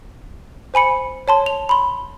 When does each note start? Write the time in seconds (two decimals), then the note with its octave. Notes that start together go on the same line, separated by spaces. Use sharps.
0.74 C5 G#5 B5 C#7
1.28 C#5 A5 C6
1.46 F7
1.69 B5 C6